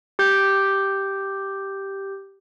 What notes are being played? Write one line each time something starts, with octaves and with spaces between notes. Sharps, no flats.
G4 G6